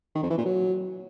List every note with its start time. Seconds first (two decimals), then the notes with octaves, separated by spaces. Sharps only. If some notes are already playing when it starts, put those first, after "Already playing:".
0.15 D#3
0.23 F2
0.30 E3
0.38 A#2
0.45 F#3